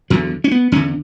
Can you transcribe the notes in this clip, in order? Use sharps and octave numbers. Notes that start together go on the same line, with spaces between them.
E2 D3 F#3
C#4
B3
E2 D3 C#4